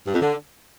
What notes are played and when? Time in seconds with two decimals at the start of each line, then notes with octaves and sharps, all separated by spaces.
0.05 G2
0.12 F2
0.20 D3